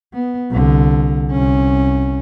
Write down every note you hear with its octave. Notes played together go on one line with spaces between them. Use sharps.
B3
C2 D3
C2 C#4